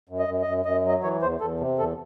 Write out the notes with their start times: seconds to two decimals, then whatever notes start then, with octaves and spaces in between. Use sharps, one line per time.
0.09 F#2
0.19 D#5
0.28 F#2
0.42 F#2 D#5
0.65 F#2 D#5
0.85 F#3 D#5
1.03 E3 C#5
1.22 E2 C5
1.41 E2 A4
1.60 C3
1.79 E2 A4